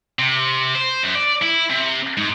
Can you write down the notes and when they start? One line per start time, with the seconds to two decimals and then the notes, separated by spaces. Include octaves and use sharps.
0.19 C3
0.75 C5
1.03 F#2
1.15 D5
1.42 E4
1.70 C3
2.17 G#2